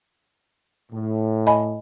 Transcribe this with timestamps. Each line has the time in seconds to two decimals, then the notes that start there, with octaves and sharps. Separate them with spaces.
0.92 A2
1.47 D#5 G#5 B5